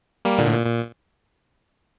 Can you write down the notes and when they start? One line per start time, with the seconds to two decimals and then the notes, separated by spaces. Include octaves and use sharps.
0.25 G3 A#3
0.38 A#2 D3
0.46 A2
0.53 A#2
0.66 A#2